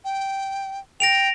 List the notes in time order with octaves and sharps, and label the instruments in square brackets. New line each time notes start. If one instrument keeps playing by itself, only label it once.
[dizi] G5
[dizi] G5 [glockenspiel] A#6 D7 F7